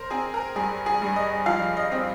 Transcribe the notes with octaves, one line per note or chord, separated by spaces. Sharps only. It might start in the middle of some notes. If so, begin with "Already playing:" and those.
Already playing: A#4 C5
C4 G#4
A#4
G2 G#4
G#4
G2
D#5
F3 F5
D#5
C4